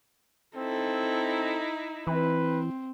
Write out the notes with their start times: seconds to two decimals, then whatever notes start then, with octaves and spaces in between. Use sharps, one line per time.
0.57 C4 D#4 E4 A4
2.07 E3 C4 B4